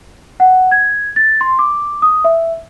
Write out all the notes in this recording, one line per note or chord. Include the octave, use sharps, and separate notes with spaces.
F#5
G#6
A6
C6
D6
D#6
E5